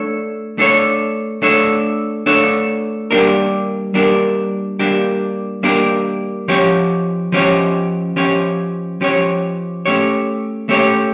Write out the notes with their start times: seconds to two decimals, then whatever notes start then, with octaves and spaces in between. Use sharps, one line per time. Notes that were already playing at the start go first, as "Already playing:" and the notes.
Already playing: A3 D4 A4 C#5
0.58 A3 D4 A4 C#5
1.42 A3 D4 A4 C#5
2.26 A3 D4 A4 C#5
3.11 G3 A#3 D4 G4 A#4
3.94 G3 A#3 D4 G4 A#4
4.79 G3 A#3 D4 G4 A#4
5.63 G3 A#3 D4 G4 A#4
6.48 F3 C#4 G4 C#5
7.32 F3 C#4 G4 C#5
8.16 F3 C#4 G4 C#5
9.01 F3 C#4 G4 C#5
9.86 A3 C#4 G4 C#5
10.69 A3 C#4 G4 C#5